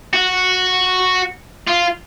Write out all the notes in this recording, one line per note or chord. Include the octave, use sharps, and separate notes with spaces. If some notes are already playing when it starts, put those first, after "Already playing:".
F#4
F4